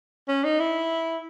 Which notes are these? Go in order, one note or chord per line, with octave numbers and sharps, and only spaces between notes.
C#4
D#4
E4